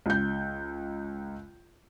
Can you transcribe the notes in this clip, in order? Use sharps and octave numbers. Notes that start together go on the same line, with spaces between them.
C#2 G6